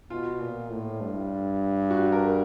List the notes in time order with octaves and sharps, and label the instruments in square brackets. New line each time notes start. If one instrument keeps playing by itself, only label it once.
[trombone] B2 [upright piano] F4
[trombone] A#2
A2
G2
[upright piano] F#4
A#4